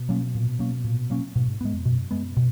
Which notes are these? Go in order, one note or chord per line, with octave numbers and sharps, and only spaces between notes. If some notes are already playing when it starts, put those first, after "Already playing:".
Already playing: B2
F#3 A#3 C#4
A#2
F#3 A#3 C#4
A#2
F#3 A#3 C#4
G#2 B2
G#2
G#2 G#3 B3
F2
F#2 B2
G#3 B3
B2